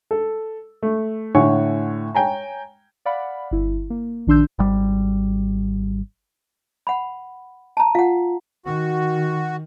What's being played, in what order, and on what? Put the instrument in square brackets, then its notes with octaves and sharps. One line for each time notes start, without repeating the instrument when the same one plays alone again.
[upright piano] A4
A3
A2 D3 C#5 F#5 G#5 C#6
C#5 G5 G#5 A#5
[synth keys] D5 F5 F#5 B5
G1 E4
A#3
A#1 D#3 D4 C6 E6 G6
[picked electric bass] G#1 G3
[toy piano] F#5 B5
A5 A#5
[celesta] F4 [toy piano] F5 F#5
[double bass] D#3 [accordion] F#4